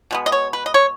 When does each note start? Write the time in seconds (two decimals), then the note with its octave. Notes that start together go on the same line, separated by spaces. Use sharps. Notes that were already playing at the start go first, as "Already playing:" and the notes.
0.11 B2 G#3 B3
0.26 D#5
0.32 C#5
0.53 B4
0.66 D#5
0.74 C#5